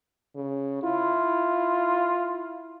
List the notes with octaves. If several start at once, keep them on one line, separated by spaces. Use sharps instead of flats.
C#3
E4 F4